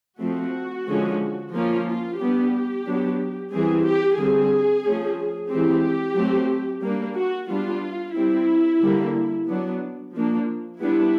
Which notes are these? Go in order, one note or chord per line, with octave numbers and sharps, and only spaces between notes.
F3 A3 C4 F#4
D3 F3 G#3 C#4
F3 A#3 C#4 F4
F4
G3 B3 D4 G4
F#3 B3 D4
E3 G3 C4 G#4
G4
D3 G3 C4 G#4
F3 A3 C#4
E3 G#3 C4 G4
F#3 A3 C4
G3 A#3 D4
F#4
G3 B3 D4 F4
G3 C4 E4
D3 G3 A#3
F#3 B3 D4
F3 A#3 D4
G3 B3 D4 E4